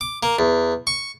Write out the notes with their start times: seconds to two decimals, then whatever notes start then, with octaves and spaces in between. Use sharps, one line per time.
0.01 D6
0.23 A#3
0.39 E2
0.87 C#6